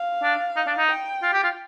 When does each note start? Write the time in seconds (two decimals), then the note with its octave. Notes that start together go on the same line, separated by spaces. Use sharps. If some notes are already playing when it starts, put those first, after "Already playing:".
Already playing: F5
0.23 D4
0.56 D#4
0.67 D4
0.78 D#4
0.89 G5
1.22 F4
1.33 G4
1.43 F4